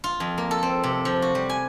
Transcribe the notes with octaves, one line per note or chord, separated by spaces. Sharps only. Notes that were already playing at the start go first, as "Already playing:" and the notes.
F4
F2
A#3
A4
C4
C3
F3
F#4
G3
G#5